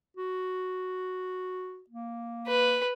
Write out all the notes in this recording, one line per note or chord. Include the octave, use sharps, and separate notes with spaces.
F#4
A#3
B4